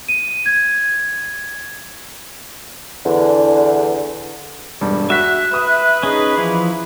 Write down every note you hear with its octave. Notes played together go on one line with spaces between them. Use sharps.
D#7
G#6
E2 D3
E1 G2 G3
F#4 E5 F#6 B6
B4 D#6
C#4 D#4 G#4
E3 F3 E4